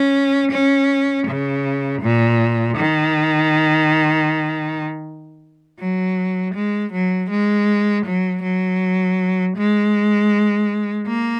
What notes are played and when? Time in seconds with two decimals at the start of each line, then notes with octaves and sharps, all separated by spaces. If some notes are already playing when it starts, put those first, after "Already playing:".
Already playing: C#4
0.52 C#4
1.27 C#3
2.02 A#2
2.78 D#3
5.80 F#3
6.55 G#3
6.92 F#3
7.30 G#3
8.06 F#3
8.43 F#3
9.57 G#3
11.07 A#3